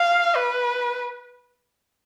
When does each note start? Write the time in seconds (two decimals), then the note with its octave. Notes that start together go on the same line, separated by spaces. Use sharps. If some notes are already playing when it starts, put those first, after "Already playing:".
Already playing: F5
0.36 B4